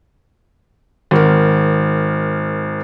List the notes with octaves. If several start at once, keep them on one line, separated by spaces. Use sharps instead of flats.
G#1 A#4